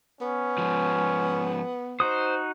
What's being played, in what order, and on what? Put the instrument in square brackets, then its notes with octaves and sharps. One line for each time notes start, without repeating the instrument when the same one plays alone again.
[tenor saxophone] B3 [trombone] C#4
[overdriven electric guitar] G#2 F3
[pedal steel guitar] D#4 F#4 D#6 [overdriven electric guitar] C5